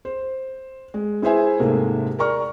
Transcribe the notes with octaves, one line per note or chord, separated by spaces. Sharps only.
C5
G#3
E4 G#4 B4 C5 E5 G#5
G#2 C3 A3 A#3
A#4 D5 A#5 C#6 F6